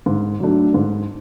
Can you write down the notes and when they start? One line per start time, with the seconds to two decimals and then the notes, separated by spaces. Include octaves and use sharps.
0.06 G#2
0.40 F#3 A3 D4
0.74 G#2